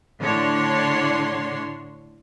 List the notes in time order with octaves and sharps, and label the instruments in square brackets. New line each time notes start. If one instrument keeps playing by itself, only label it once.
[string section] A2 D3 D4 C#5 C6